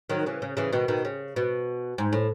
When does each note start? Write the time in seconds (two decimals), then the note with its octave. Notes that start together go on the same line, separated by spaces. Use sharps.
0.10 D#3 F#3
0.26 C#3 E3
0.42 C#3
0.57 C#3 E3
0.73 B2 D#3
0.88 B2 D#3
1.05 C#3
1.36 B2
1.98 G#2
2.13 A2